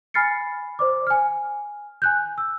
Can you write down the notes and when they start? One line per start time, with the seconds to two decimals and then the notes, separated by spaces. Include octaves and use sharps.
0.14 G#5 B5 F6 A6 C7 C#7
0.79 C5 D5 D6
1.07 G#5 F6
2.02 G#5 F#6 G6
2.38 E6